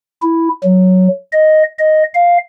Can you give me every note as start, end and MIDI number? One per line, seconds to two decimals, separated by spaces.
0.22 0.48 64
0.64 1.08 54
1.32 1.63 75
1.79 2.03 75
2.14 2.37 77